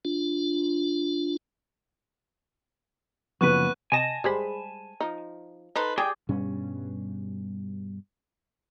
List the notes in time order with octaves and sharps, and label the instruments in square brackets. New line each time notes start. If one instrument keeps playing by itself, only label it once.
[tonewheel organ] D4 F4
[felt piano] F#1 F3 [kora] B3 B4 [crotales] C#6 F#6 D#7
[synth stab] C3 D#5 A#6 [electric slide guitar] G#5 A5
[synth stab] G#1 G#4 B5 [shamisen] G3 G#3 C5
[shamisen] F3 D#4
[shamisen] D#4 [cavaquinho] A4 B4 C5
[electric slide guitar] G4 G#4 D5 [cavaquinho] G5
[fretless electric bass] G2 B2 G3 C#4